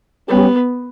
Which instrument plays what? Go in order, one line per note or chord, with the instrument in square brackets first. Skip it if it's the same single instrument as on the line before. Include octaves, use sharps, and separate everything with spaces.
[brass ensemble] G3 C#4 G4 [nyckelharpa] B3